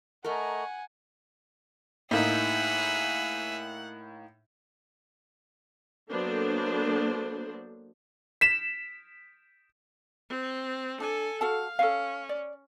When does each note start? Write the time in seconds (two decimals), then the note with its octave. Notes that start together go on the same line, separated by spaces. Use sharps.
0.24 A3 A#4 D#5 F#5 G#5 A#5 C#6
2.11 A2 A#3 D#4 G#4 E5 F#5
6.10 F#3 A#3 B3 D4 A4 C5
8.41 B6 E7
10.30 C4
11.00 D4 A4 G#5
11.41 F#4 A4 F5 A5
11.79 C#4 A4 F5
12.29 D5